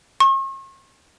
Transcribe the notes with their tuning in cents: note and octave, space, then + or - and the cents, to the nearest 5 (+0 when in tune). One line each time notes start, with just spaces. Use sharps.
C#6 -45